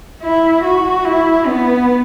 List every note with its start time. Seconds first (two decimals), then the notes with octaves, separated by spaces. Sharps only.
0.22 E4
0.64 F#4
1.05 E4
1.47 B3